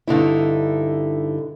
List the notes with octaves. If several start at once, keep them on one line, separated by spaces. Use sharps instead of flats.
G2 D3 D#4 E4